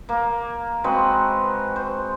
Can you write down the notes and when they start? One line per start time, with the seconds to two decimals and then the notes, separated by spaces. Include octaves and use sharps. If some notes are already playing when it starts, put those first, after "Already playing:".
0.09 A#3
0.84 G#3 C4 F#4 B4
1.76 C5